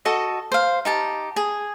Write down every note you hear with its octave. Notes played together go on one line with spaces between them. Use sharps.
F#4 A4 D#5 A5
C5 F5
D#4 G4 A5
G#4